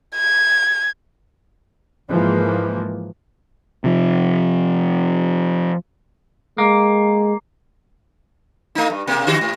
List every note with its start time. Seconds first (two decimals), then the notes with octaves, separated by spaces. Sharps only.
0.15 G#6
2.09 G#2 E3 F3 G#3 A#3
3.84 C3 F3
6.58 G#3 A#3
8.75 A3 D#4
8.90 G2
9.07 B2 A#3
9.27 D3 F#4 G4
9.41 G#2